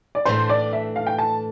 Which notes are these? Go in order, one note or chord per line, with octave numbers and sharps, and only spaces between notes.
D5
A2 E3 A3 D4 C5
D5
E5
F5
G5
A5